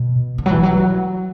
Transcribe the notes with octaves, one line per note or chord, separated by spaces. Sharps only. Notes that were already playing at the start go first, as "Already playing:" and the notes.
Already playing: B2
D3
F#3
E3
F#3